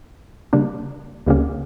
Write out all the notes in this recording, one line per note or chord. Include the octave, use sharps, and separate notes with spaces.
C#3 G3 A#3 D4
D2 C#3 G3 A#3 C#4